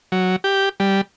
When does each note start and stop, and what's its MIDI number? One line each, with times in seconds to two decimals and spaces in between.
0.12 0.36 54
0.44 0.69 67
0.80 1.01 55